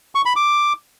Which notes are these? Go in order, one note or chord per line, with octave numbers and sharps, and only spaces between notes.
C#6
B5
D6